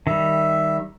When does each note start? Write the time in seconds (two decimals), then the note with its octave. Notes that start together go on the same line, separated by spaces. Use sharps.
0.07 D#3 G3 E5